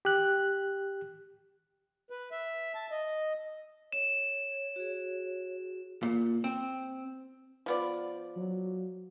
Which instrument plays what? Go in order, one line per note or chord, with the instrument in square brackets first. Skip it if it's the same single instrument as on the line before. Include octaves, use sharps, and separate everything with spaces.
[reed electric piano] G4 F#6
[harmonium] B4
E5
A5
D#5
[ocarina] C#5 [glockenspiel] E7
[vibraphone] F#4 G#4
[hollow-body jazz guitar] A#2
C4
[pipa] F3 B3 D5
[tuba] F#3